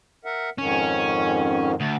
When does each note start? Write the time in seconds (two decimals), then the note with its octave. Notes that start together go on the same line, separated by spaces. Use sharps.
0.25 A#4 E5 F#5
0.58 F2 G#2 D#3 C#4
1.80 D2